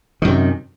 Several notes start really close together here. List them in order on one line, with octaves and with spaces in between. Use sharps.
D#3 F#2 C3